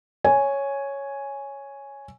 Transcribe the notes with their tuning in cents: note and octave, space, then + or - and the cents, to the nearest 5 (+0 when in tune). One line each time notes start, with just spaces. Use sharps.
C#5 +0 G#5 +0